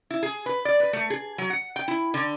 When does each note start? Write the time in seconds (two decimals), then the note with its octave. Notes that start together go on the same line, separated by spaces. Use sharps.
0.10 E4
0.23 G#4
0.46 B4
0.65 D5
0.80 B4
0.93 A3
1.10 G#4
1.38 F#3
1.50 F#5
1.76 G5
1.88 E4
2.14 D3